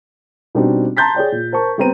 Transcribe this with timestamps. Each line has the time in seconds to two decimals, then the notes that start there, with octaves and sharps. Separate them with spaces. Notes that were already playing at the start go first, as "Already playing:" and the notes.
0.55 B2 G3 C4 D4 D#4 F#4
0.97 A5 A#5 C6 G6 A6 B6
1.15 G#4 C#5 D5 G5
1.32 A#2
1.52 A#4 C5 A5 C#6
1.78 G3 B3 C4 A#5 D#7